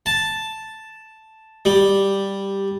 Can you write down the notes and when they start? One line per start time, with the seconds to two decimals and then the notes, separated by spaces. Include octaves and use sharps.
0.06 A5
1.65 G3